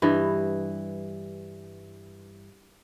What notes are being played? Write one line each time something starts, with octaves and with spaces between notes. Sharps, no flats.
G2 E3 D#5